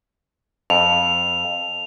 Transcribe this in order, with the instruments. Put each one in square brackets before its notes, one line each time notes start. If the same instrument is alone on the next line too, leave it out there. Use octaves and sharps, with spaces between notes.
[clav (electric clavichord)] F2 [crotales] F7